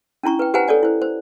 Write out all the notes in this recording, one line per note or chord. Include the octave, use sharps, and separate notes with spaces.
C#4 D4 E4 A#5 C#6
B4 G5
G4 B4 C5 F#5 G#5 A#5
A4 C#5 D5 G#5
E4 C5
C5